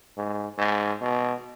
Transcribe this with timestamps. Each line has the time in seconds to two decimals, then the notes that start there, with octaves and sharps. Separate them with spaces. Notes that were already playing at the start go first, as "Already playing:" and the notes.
0.17 G#2
0.58 G#2
1.01 B2